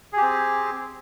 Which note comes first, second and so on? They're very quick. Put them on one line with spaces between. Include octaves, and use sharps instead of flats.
G#4 G4 C4